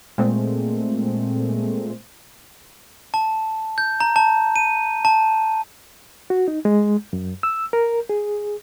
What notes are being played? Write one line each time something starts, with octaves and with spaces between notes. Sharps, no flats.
A#2 G#3 A3 C4
A5
G6
A#5
A5
D#7
A5
F#4
D#4
G#3
F#2
E6
A#4
G#4